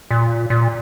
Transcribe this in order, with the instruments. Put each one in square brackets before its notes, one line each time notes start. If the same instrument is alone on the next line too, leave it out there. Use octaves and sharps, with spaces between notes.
[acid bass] A#2
A#2